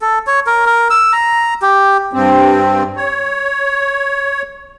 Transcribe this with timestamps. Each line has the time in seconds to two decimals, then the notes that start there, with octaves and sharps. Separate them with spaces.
0.02 A4
0.27 C#5
0.47 A#4
0.66 A#4
0.90 E6
1.13 A#5
1.62 G4
2.13 G2 C4
2.96 C#5